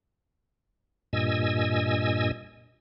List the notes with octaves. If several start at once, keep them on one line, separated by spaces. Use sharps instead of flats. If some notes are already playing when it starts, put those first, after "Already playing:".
G2 A#2 D#5 G#5 E6